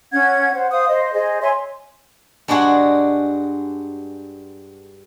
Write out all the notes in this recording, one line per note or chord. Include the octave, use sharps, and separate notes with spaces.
C#4 F#5 G#6
C5 F#5
C5 F5 D#6
C5 D#5
G#4 C5 D#5
C#5 E5 G#5 C6
G2 G#3 D4 F#4 G#4